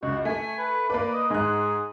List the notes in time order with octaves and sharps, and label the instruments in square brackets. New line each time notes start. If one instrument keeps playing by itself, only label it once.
[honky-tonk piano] C#2 [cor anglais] F#4
[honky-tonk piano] A3 [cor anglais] G#5
[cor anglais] B4
[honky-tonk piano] A#3 B4 [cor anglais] D5
[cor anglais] D#5
[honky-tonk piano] G#2 F#6 [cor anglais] G#4